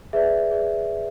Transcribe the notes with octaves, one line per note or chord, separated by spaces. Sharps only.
G#4 B4 D5 E5
G#4 B4 D5